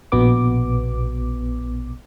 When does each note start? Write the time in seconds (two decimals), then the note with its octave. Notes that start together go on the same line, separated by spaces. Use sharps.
0.12 A#1 B2 B3 D6